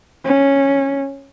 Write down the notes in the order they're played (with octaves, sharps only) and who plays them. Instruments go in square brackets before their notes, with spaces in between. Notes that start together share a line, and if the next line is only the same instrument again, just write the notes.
[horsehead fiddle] C#4